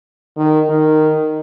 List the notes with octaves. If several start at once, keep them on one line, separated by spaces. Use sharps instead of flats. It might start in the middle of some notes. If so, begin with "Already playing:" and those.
D#3
D#3